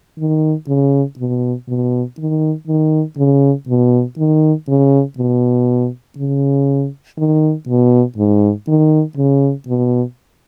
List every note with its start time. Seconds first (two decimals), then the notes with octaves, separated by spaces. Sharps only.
0.19 D#3
0.68 C#3
1.19 B2
1.68 B2
2.18 D#3
2.67 D#3
3.17 C#3
3.68 B2
4.18 D#3
4.68 C#3
5.18 B2
6.18 C#3
7.18 D#3
7.68 B2
8.17 G#2
8.68 D#3
9.17 C#3
9.67 B2